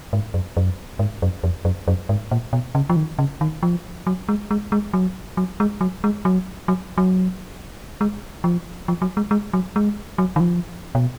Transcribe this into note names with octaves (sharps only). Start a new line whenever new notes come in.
G#2
F#2
F#2
G#2
F#2
F2
F#2
F#2
G#2
A#2
B2
C#3
F3
D#3
C#3
D#3
F3
F#3
G#3
G#3
G#3
F#3
F#3
G#3
F#3
G#3
F#3
F#3
F#3
G#3
F3
F3
F#3
G#3
G#3
F#3
G#3
F#3
D#3
F3
B2